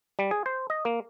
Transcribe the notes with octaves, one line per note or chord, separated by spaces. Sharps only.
G3
G#4
C5
D#5
A#3